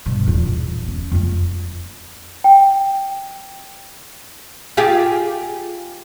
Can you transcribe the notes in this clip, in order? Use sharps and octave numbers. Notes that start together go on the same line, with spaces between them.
G2 B2
D#1 E2
C#4
F2 A3
G5
F4 G4 G#4